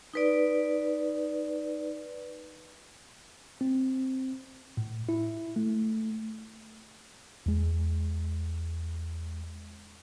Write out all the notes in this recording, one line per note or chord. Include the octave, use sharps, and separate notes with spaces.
D#4 B4 D5
C4
A2
E4
A3
E2 G#3